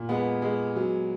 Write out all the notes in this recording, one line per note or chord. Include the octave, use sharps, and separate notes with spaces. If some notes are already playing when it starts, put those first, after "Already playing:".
Already playing: A#2
G#3 B3
G#3
F#3